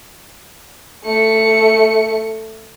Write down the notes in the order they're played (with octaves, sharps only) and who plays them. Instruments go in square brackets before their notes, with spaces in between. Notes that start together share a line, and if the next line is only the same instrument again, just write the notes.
[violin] A3 C#7